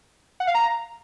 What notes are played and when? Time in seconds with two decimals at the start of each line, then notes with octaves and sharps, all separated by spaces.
0.40 F#5
0.47 F5
0.54 A#5